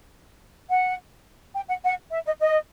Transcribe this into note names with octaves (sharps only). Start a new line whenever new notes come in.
F#5
G5
F#5
F#5
E5
D#5
D#5